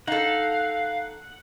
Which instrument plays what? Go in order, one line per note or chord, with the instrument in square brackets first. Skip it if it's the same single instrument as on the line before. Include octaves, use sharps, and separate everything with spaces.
[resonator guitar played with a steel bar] D#4 A4 [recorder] F5 [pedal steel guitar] F#5